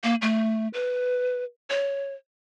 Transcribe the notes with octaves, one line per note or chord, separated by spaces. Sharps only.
A#3
A3
B4
C#5